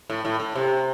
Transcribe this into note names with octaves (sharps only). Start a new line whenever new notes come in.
A2
A2
A2
C3